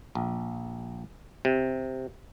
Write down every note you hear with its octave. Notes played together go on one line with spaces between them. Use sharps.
A#1
C3